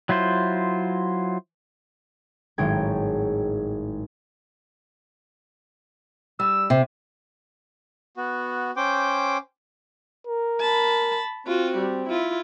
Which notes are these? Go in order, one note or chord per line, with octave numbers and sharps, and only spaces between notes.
F#3 E4 F4 C5
G#1 A2 F#3 G#3 G5 G#6
G3 E6
C3
B3 F#4
C#4 C5 G5 D6
A#4
A5 B5
C4 F4 F#4
G3
E4 F4